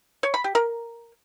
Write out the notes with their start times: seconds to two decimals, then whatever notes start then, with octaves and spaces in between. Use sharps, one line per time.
0.23 C#5
0.34 B5
0.44 G4
0.55 A#4